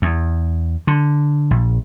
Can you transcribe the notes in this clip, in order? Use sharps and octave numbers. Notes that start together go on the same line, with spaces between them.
E2
D3
A#1